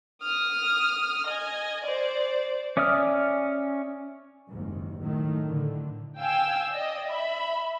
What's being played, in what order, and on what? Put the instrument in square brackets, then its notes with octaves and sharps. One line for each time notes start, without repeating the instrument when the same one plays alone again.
[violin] D#6 F6
D#5 G#5
C5 D5
[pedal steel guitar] C#4 D5 E5 D#6 F6
[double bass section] F#1 D#2 G#2
A2 D#3 F#3 A3
A2 D3
[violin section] F5 G5 G#5 E6
D5 D#5
E5 B5